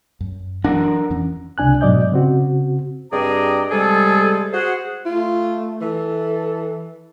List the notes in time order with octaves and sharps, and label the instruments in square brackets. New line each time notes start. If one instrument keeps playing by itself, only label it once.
[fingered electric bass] F#2
[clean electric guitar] D3 A#4 F#5 [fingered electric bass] E3 F#3 [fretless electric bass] D4
[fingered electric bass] F2 E3 C#4
[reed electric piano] C#2 C3 D4 G#5 F#6
G#2 B2 F#3 D5 D#5 G6
C#3 C4 F#4
[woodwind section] G2 C4 G#4 D5 D#5 A#5
C3 G3 G#3 G#4 A4
F#4 G#4 C5 F#5
[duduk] A3 [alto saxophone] F4
[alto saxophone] E3 [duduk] A4